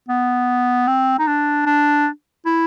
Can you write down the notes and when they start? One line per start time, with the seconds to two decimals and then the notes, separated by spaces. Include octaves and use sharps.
0.09 B3
0.88 C4
1.19 D#4
1.27 D4
1.66 D4
2.46 E4